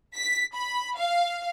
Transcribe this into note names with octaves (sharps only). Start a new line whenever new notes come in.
B6
B5
F5